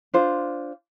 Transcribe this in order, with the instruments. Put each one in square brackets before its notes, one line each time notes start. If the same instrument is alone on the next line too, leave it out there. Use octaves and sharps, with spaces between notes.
[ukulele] D4 F4 C5